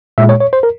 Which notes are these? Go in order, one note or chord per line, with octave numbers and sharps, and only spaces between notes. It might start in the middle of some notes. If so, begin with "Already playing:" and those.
A#2 G#3 E5
C#5
C#5
C5
A#4